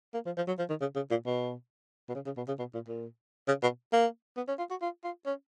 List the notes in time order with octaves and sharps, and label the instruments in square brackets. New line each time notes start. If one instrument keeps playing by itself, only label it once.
[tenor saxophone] A#3
F3
F3
F#3
F3
D#3
C#3
C#3
A#2
B2
B2
C#3
C#3
B2
C#3
B2
A#2
A#2
C#3
B2
A#3
B3
C#4
F4
F#4
F4
F4
C#4